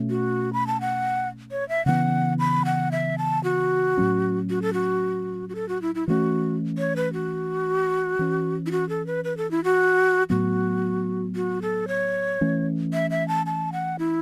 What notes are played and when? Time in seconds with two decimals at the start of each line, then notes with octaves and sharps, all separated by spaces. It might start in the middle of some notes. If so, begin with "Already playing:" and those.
Already playing: B2 A3 C#4
0.10 F#4
0.53 B5
0.67 A5
0.81 F#5
1.51 C#5
1.69 E5
1.86 C#3 E3 B3 F#5
2.39 B5
2.65 F#5
2.92 E5
3.18 A5
3.44 F#4
3.97 A2 F#3 C#4
4.50 F#4
4.62 A4
4.73 F#4
5.49 F#4
5.55 A4
5.69 F#4
5.82 E4
5.95 E4
6.08 E3 A3 C#4 F#4
6.78 C#5
6.96 B4
7.13 F#4
8.19 E3 C#4
8.66 E4
8.71 F#4
8.89 A4
9.07 B4
9.24 B4
9.37 A4
9.51 E4
9.64 F#4
10.30 A2 F#3 B3 F#4
11.35 F#4
11.62 A4
11.88 C#5
12.41 E3 A3 C#4
12.93 E5
13.11 E5
13.28 A5
13.46 A5
13.73 F#5
13.99 E4